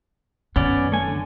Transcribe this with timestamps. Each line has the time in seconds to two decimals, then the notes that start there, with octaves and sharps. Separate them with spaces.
0.56 F#2 D#3 B3 C#4 D5
0.92 A3 G#5
1.07 D3